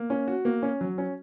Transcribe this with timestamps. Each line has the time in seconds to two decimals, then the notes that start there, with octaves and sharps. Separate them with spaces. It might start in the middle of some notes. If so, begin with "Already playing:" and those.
Already playing: A#3
0.10 C#4
0.28 F#4
0.45 A#3
0.62 C#4
0.81 F#3
0.98 C#4